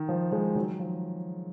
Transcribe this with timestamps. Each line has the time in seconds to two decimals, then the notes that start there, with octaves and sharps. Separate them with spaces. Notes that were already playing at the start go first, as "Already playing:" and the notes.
Already playing: D#3
0.09 F3
0.32 F3 G#3
0.55 D#3 F#3
0.79 F3